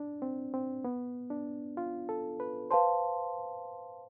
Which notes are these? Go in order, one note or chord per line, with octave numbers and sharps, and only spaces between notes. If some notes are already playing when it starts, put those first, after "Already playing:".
Already playing: D4
C4
C4
B3
D4
F4
A4
B4
B4 C5 F5 A5 C6